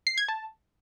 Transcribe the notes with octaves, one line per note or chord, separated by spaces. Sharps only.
C7
G#6
A5